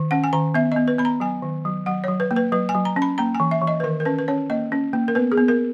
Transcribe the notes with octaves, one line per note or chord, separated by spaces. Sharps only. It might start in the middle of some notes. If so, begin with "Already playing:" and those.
Already playing: D#3
C#4 F#5
G#5
D#3 A#5
B3 E5
B3 D#5
B4
B3 B5
A#5
F#3 G#5
D#3
F#3
F#3 F#5
F#3 C#5
B4
A#3
B4
F#3 B4
G#5
F#3
A#5
C#4
B5
A#3 A#5
G#5
E3
E5
E3
D#5
B4
D#3 A#4
A#4
C#4 B4
B4
C#4 C#5
A#3 D#5
C#4
A#3
A#4
B3 B4
G#4
B3
A#4